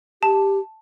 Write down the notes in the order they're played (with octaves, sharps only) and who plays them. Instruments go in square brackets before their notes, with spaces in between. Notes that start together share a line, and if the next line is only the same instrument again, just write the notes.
[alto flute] G4 [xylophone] A5